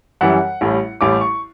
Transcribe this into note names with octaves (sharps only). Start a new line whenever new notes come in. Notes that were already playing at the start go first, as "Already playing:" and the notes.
F#2 E3 G3 F#5
A1 A2 G3
A1 A2 G3 D6
C#6